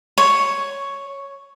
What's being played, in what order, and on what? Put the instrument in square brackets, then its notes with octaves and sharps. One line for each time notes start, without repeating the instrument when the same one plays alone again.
[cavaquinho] C#5